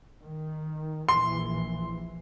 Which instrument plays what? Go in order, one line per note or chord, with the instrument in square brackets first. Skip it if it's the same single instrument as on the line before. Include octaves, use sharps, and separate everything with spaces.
[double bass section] D#3
[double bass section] A#1 E3 [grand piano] C6